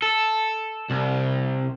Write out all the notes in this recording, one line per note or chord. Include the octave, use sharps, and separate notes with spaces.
A4
C2